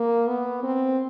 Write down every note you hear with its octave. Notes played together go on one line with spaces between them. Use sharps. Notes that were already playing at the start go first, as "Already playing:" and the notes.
Already playing: A#3
B3
C4